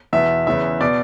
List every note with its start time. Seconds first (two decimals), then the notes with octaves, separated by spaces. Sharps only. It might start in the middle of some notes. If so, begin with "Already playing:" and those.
0.13 E2 B2 E5
0.47 E2 C#3 E3 E5
0.81 B2 D5